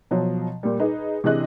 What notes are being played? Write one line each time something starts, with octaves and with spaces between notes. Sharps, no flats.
B2 F3 F#3
A#2 G3
D#4 G#4 B4
C3 E3 D4 G#4 D#5 F#6